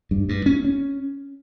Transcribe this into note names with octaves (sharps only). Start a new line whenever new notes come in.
G2
G2
C#4
C#4